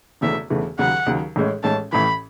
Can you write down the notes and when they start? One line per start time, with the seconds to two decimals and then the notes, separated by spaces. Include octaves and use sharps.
0.21 E1 E2 C#3 E3 A3 E5
0.50 E1 E2 C#3 E3 A3
0.79 D#2 C#3 F#3 F#5
1.06 D#2 C#3 F#3
1.36 A1 A2 G#3 C#4
1.63 A1 A2 G#3 C#4 A5
1.93 A1 A2 E3 B5